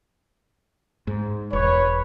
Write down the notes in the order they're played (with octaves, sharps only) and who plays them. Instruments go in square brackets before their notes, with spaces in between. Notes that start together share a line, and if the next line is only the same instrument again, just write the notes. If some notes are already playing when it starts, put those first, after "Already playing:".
[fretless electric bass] G#2
[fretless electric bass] E1 [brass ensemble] B4 C#5